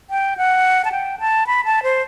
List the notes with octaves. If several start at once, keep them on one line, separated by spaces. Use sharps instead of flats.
G5
F#5
A5
G5
A5
B5
A5
C5